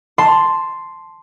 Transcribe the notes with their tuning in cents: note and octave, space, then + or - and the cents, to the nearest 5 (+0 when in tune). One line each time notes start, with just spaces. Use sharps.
A5 +0 C6 +0